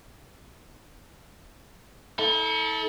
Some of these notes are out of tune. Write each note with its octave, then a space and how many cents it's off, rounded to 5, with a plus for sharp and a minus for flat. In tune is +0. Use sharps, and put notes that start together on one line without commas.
E4 -45 A4 +0